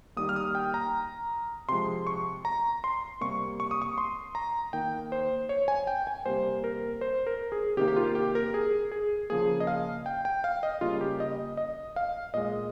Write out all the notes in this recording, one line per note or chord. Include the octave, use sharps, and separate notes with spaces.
D#3 G3 A#3 D#6
F6
D#6
G5
A#5
C3 F3 G#3 C6
C#6
A#5
C6
C3 G3 A#3 C#6
C#6
D#6
C#6
C6
A#5
D#3 A#3 G5
C5
C#5
G#5
G5
G#5
C3 G3 A#3 C5
A#4
C5
A#4
G#4
C3 D#3 A#3 G4
G4
F4
G4
A#4
G#4
G#4
C#3 F3 A#3 G#4
D#5
F5
G5
G5
F5
D#5
C#3 G3 A#3 F4
G4
D#5
D#5
F5
A#2 G#3 D#5